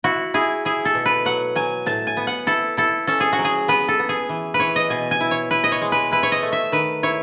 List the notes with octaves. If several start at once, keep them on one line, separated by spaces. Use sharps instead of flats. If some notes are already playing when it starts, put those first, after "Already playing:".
E4 F#4
E4 G#4
E4 G#4
A4
B2
B4
F#3 F#5
F#3 G#5
A2 A5
G#5
B3
F#5
E4 A4
E4 A4
C#4 A4
G#4
F#4
F#3
G#4
B3 B4
A4
B3
G#4
E3
B4
E3 C#5
D#5
B2 G#5
G#5
E4
C#5
E4 B4
D#5
C#5
G#3
B4
E4 B4
C#5
D#5
A3
E5
D#3 B4
E4 C#5